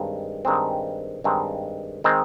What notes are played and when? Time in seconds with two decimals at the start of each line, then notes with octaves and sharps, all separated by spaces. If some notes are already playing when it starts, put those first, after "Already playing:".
Already playing: G2 D#3 G#3 C4
0.45 G2 D#3 G#3 C4
1.24 G2 D#3 G#3 C4
2.04 D#3 G#3 C4